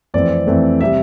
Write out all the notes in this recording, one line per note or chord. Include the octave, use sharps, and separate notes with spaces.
F2 E3 A3 C4 D5
F2 E3 A3 C4
C3 G3 E5